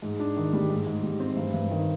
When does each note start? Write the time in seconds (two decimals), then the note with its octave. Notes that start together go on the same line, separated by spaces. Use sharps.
0.02 G#2
0.19 D4
0.36 D#3
0.53 G3
0.70 G#2
0.87 G#2
1.03 G3
1.20 C4
1.37 G2
1.54 G2
1.71 D#3